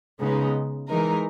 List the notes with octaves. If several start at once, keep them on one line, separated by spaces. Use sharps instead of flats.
C#3 G#3 B3 D#4
E3 G#3 D#4 A#4